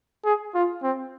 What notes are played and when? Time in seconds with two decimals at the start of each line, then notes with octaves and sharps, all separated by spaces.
0.25 G#4
0.55 F4
0.83 C4